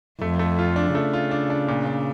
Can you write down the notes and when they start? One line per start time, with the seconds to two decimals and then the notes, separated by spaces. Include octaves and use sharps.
0.21 F2 A3
0.39 A3
0.58 F4
0.76 D4
0.95 C#3 A3
1.13 F4
1.31 D4
1.50 D4
1.68 A#2
1.87 D4